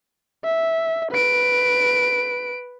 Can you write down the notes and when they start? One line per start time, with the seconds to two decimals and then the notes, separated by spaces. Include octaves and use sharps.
0.44 E5
1.11 B4 D7